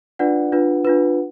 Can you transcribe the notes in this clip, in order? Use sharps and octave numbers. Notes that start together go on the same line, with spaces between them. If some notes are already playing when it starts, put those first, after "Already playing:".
D4 F4 B4 D5 F#5
D4 F4 B4
D4 F4 B4